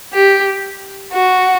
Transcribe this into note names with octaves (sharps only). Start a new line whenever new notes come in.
G4
F#4